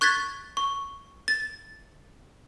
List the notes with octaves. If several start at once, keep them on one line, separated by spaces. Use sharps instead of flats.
C#6 F#6 G#6 A6 B6
C#6
A6